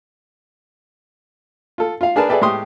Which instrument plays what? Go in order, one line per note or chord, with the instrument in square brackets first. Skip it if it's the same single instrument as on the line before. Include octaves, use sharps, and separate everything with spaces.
[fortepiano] F4 A4
F4 F5
D4 G#4 A#4 B4 A5
G#4 A4 B4 D5 E5 G5
A2 G#3 G4 C6 D#6